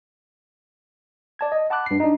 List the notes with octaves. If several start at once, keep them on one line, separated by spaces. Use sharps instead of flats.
D5 A5 G#6
D#5
F#5 A5 B5 D6 F#6
G2 C7
D4 D#4